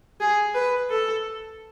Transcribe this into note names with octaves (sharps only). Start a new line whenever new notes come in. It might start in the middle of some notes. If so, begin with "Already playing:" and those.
G#4
B4
A4